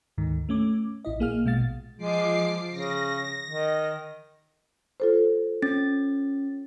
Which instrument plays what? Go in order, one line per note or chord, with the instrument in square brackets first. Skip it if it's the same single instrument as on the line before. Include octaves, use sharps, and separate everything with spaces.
[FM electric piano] D2 G#2 D#3
A3 C#4 D6
A1 E4 D#5
A#1 A#3 G#4 F5 F6
A#1 B2 G#3 F5 A6
[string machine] F3 D6 C7 [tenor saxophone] G#3
[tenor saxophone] C#3 [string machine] A#6
[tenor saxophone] D#3
[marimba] F4 A4 C5
[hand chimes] C#4 A6